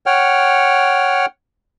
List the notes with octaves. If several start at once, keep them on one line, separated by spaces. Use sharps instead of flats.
C#5 F#5 G5 F6